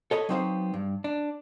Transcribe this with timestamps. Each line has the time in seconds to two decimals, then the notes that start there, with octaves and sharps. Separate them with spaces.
0.11 A4 C#5 D#5 B5
0.29 F#3 B3 C4 D#4 C5 F5
0.74 G2
1.04 D4